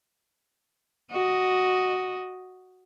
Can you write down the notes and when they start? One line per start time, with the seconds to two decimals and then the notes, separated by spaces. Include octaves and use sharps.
1.11 F#4 D#5